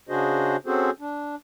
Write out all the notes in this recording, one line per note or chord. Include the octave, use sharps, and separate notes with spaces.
C#3 D4 F#4 G#4 C5 D#5
C4 C#4 F#4 G#4 A4 C5
D4